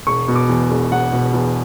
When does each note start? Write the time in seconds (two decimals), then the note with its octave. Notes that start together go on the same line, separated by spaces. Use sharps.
0.07 E1 C#6
0.28 B2
0.36 D6
0.49 E2
0.71 E1
0.92 E1 F#5
1.13 B2
1.34 E2